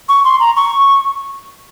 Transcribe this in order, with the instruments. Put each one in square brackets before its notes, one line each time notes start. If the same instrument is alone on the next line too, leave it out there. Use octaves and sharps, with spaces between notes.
[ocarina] C#6
C6
A#5
C#6